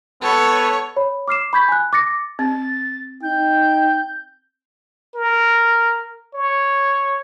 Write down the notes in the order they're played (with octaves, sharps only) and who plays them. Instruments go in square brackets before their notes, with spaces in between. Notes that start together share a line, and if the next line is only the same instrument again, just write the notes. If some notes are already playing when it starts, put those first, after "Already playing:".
[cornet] B3 [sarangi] A4 [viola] C#5
[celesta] C#5 B5
D6 F6 C7 E7
B5 C#6 G6 G#6 B6
G#5 F#6
D6 A6 A#6 C#7
[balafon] C4 [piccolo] A6
[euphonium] D#4 [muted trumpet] G5 [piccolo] G6
[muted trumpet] A#4
C#5